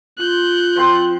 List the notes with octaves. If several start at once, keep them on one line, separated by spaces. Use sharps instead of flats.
F4 F#6 G6
F3 C4 C5